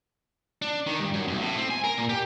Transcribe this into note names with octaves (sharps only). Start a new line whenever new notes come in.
D4
D#3
G2
F#2
B1
A2
C4
G#5
A#4
A#2
G4